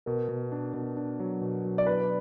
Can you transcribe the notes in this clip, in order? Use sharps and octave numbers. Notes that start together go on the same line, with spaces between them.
B2 A#4
B2
D4
B2
D4
F#3
B2
F#3
D5
D4 B4